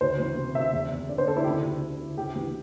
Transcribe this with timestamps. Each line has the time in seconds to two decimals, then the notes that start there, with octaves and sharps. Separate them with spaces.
0.01 D2 C5
0.20 E3
0.37 C3
0.55 D2 E5
0.73 E2
0.92 E2
1.09 D3 D5
1.18 C5
1.27 D3 A4
1.37 E4
1.44 D2 G4
1.51 E4
1.63 D2
1.81 D3
2.00 D3
2.17 D2 G4
2.36 E3